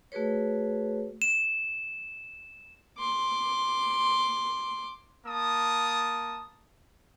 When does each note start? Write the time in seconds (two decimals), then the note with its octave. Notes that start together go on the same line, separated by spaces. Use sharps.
0.12 A3 F#4 G#4 B4 C#5
1.22 E7
2.98 C6 D6
5.26 A#3 A5 D#6